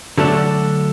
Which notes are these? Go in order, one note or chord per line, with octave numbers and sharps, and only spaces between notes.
D3 F#3 A3 D4 A4